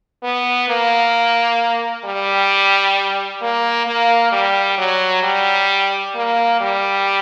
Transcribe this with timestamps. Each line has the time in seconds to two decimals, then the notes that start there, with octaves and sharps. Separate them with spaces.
0.23 B3
0.69 A#3
2.05 G3
3.42 A#3
3.87 A#3
4.32 G3
4.78 F#3
5.23 G3
6.15 A#3
6.61 G3